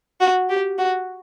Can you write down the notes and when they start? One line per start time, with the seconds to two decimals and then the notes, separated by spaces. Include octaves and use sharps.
0.21 F#4
0.49 G4
0.78 F#4